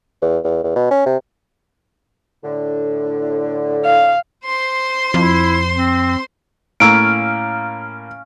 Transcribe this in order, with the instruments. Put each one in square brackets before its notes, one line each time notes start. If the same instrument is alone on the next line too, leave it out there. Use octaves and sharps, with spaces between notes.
[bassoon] E2
E2
E2
B2
C#4
C3
[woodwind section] A2 D3
[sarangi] F5
[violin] C5 C6
[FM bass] F2 [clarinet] E4
[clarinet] C4
[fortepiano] A2 A#3 E6 [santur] C#4 F5 [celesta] D7